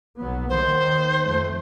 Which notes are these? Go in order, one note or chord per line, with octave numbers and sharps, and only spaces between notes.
B1 F#3 B3
D#2 D#3 C5
F2 A3